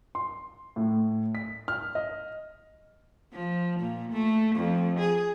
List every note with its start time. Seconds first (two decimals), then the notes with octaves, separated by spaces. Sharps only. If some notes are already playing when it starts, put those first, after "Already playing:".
0.15 C6
0.76 A2
1.35 B6
1.68 F6
1.95 D#5
3.33 F3
3.80 A#2
4.12 A3
4.56 F2
4.99 G#4